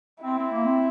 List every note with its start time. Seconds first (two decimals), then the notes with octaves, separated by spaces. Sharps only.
0.23 C4 E4
0.37 C4
0.52 A#3
0.65 C4